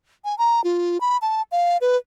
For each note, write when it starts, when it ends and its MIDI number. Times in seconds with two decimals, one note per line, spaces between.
0.25 0.37 80
0.38 0.63 82
0.64 1.01 65
1.01 1.17 83
1.22 1.42 81
1.52 1.77 77
1.81 1.97 71